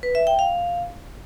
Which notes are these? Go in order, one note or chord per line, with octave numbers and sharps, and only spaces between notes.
B4
E5
G5
F5